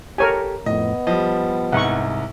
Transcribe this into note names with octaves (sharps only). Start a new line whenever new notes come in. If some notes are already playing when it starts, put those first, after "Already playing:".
G4 A4 A#4 C#5 G#5
F2 A2 B3 D#5
F3 G3 D#5
C2 G#2 F#5 C#6